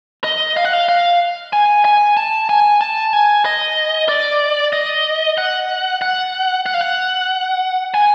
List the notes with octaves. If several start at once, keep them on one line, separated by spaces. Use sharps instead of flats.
D#5
F5
F#5
F5
F5
G#5
G#5
A5
G#5
A5
G#5
D#5
D5
D#5
F#5
F#5
F#5
F5
F#5
G#5